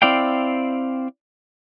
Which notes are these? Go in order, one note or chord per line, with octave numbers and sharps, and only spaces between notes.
C4 E4 D5 F5 G5